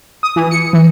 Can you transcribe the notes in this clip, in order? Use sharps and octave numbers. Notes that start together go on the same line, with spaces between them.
D#6
E3
C#7
E3